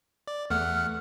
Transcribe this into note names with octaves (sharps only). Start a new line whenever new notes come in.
D5
E2 A3 F#5 F6